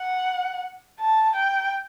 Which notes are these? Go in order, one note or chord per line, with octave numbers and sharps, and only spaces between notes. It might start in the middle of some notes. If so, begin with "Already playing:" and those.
Already playing: F#5
A5
G5